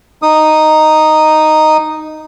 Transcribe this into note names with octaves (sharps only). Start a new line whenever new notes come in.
D#4 D#6